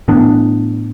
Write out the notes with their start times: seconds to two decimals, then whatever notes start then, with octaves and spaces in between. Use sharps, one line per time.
0.08 A2 E3 B3 D4